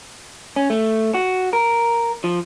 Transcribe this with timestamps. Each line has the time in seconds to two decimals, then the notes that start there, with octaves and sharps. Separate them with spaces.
0.56 C#4
0.70 A3
1.14 F#4
1.53 A#4
2.24 F3